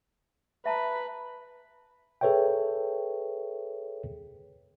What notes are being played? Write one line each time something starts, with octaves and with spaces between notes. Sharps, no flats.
B4 E5 A5 A#5
G#4 A4 B4 C#5 E5 G5